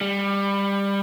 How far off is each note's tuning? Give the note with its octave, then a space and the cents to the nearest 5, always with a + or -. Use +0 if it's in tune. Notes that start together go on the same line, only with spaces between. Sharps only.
G3 +20